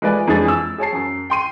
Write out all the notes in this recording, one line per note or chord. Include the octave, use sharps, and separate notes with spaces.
G#3 A3 F4 B4 D5 G#5
F2 E3 G#3 D4 G#4 A6
E6
G#4 C#5 A5 C7
F#2
G5 C6 D#7